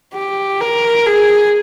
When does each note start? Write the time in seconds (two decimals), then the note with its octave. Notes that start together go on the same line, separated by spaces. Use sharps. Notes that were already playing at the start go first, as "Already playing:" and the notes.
0.15 G4
0.60 A#4
1.06 G#4